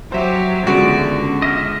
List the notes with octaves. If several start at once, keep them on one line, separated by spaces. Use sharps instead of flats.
F#3 G4 C5 E5
C#2 D3 G#3 B3 F#4 D5
C#2 D#5 E5 F6